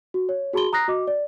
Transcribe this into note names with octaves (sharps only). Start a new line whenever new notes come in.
F#4
C#5
F#4 G#4 A5 B5 C6 G7
A#5 D#6 F#6 A#6 C7
F#4 D#5 D6
D5